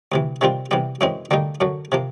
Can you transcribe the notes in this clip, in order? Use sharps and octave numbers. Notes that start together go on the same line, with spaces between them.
D2 C3 E3
C3 D#3 G3 C4 F4
C3 E3 G3 B3
F#2 C#3 E3 G#3 C4
D2 D3 G3 A#3 D#4
F#2 D3 F#3
C3 F3 A#3